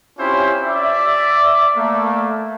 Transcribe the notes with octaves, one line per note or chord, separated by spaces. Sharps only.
C4 C#4 E4 F4 G4 C5
D5 E5
A3 A#3